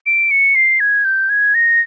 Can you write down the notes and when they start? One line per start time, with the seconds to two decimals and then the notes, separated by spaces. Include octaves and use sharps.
0.06 D7
0.31 C#7
0.55 C7
0.80 G#6
1.05 G6
1.30 G#6
1.55 A#6